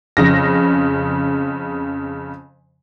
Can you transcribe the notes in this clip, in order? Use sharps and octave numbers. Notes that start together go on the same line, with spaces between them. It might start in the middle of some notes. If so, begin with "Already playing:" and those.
F2 C#3 A#6